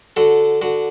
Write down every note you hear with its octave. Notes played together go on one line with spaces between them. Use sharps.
D3 F#4 A4
D3 F#4